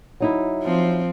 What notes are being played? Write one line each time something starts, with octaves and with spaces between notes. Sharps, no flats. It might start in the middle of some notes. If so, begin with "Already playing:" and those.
F#3 D#4 E4
F3 C4